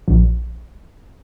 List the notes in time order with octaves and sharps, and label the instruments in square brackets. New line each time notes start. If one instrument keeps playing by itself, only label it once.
[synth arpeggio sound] A#1